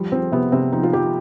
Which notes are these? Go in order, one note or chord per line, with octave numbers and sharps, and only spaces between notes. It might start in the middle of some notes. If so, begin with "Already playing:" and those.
Already playing: F3 G3
F3 C4
C3 B3
C3 C4
F3 D#4
F4
F3 G4